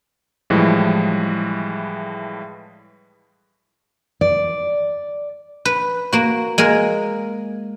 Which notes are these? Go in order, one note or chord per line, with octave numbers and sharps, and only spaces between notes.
A2 E3 F3 G3 G#3
D5
B4
A#3 F#4
G#3 A#3 G#4 A#4